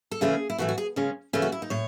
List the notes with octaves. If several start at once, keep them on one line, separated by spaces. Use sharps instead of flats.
A4
C#3 E3 A3 C#4 G#4
E4
A2 E3 A3 F#4
F#4
G#4
C#3 G#3 C#4
C#3 E3 A3 C#4 E4
F#4
E4
D#4
A2 C#5